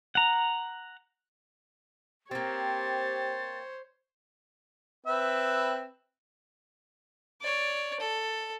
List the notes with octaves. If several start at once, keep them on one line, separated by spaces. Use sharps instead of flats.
F#5 A#5
A#3 C4 G4 C5 C#5 A6
C4 B4 E5
C#5 D5
A4